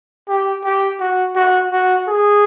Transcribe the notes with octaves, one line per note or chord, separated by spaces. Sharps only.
G4
G4
F#4
F#4
F#4
G#4